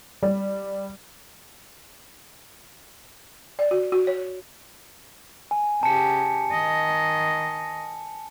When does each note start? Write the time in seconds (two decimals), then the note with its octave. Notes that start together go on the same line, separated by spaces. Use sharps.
0.23 G3
3.59 D5
3.71 F#4
3.92 F#4
4.07 C#5
5.51 G#5
5.83 C#3 G4 A5 C#7
6.51 D#3 D#5